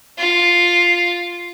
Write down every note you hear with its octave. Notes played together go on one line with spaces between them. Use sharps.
F4